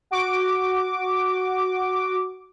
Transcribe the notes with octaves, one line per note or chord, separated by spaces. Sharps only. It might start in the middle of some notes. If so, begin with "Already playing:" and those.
F#4 D6